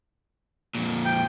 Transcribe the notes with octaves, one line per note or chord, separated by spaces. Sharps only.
F2 A#2
G5